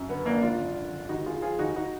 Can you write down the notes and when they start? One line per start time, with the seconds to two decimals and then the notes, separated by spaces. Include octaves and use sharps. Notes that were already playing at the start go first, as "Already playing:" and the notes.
Already playing: F#2
0.09 D3 B3
0.26 G#1 A#3 D4
0.42 G#1 D4 F4
0.59 F#2
0.76 D3
0.92 G#1
1.09 D#2 D#4 F#4
1.26 D3 F4 G#4
1.42 F3 F4 G#4
1.59 D#2 D#4 F#4
1.76 D#4 F#4